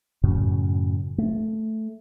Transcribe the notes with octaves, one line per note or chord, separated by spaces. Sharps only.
F#2 A2 C#3 F#3
A3